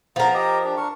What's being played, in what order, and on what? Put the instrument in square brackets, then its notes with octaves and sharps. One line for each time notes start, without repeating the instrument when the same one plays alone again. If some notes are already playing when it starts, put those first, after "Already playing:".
[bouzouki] F3 A#4 [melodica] B3
[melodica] G4 D#5
D4 G4
D4 A#4 C#6